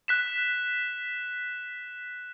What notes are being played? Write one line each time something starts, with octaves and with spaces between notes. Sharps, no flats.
F#6 B6 E7